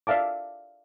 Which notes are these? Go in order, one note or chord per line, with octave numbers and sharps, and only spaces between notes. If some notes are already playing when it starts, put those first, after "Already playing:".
D5 E5 F5 A5 D6